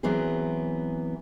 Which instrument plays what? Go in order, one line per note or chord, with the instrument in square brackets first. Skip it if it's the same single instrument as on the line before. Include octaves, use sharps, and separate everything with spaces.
[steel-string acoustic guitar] E3 F#3 B3 C4 G#4